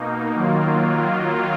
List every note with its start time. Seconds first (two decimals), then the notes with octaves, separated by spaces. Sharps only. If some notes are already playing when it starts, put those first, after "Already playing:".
Already playing: B2 A#3 D#4
0.35 D#3 F#3 A#3 F4